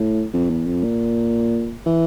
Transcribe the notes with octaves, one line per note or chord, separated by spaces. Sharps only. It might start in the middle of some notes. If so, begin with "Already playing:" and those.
Already playing: A2
F2
E2
F2
A#2
E3